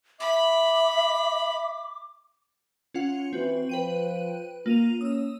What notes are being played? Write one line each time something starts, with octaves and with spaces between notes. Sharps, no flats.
E5 B5 D6
C#4 F4 F#5
E3 C4 F#4
F3 B4 G5 D#7
A#3 F4 D#7 F7
C#4 D#6 E6